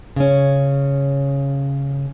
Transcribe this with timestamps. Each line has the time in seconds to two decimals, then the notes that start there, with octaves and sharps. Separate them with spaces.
0.16 C#3 C#4